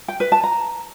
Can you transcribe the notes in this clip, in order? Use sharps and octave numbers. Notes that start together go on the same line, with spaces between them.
G5
B4
A5
A#5